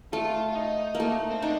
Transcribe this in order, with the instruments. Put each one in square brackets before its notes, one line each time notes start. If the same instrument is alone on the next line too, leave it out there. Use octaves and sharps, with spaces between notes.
[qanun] A3 [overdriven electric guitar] F4
[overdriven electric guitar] F4
D#4
[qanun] A#3
A3
[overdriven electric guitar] C4
[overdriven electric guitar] D4 [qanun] D#4